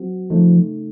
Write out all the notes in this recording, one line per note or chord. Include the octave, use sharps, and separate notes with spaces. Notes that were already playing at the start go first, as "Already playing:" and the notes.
Already playing: F#3 C4 F#4
C#3 F3 A3 D#4